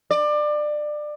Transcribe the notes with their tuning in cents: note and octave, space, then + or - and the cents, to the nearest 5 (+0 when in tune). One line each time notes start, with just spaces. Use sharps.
D5 +25